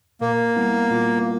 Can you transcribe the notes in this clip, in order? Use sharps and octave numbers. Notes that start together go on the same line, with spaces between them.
A#2 A#3
G3 B3 E4
A#2